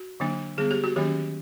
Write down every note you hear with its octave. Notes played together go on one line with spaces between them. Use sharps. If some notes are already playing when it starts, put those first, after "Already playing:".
Already playing: F#4
D3 F#3 A#3 D4
D3 G3 B3 G#4
G4
F#4
D#3 F#3 A#3 C#4 G4